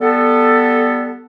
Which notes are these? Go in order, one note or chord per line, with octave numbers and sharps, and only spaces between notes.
G3 B3 A4